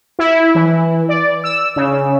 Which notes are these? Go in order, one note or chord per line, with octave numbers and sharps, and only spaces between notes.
E4
E3
D5
E6
C#3